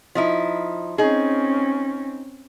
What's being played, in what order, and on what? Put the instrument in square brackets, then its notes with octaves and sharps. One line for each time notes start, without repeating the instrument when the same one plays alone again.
[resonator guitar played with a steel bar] F3 D#4 E4
[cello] C4 C#4 [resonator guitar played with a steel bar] D#4 G#4